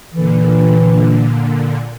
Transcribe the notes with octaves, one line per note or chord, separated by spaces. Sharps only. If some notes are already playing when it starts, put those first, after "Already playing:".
A#2 D3 E3